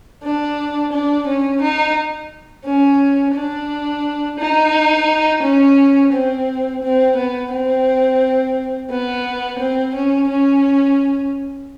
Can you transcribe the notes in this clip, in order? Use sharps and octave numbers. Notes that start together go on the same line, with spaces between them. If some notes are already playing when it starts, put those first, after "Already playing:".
D4
D4
C#4
D#4
C#4
D4
D#4
C#4
C4
C4
B3
C4
B3
C4
C#4
C#4